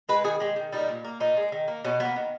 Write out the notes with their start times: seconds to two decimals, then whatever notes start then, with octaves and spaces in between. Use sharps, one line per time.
0.09 G#3 B4
0.24 D#3 G#4
0.40 G#3 G4
0.56 D#3
0.72 G3 A#3 D#4
0.89 A#2
1.04 A#3
1.20 A#2 D#4
1.37 G#3
1.52 D#3
1.68 A#3
1.85 B2 C#4
2.00 A#3 B3
2.16 D#3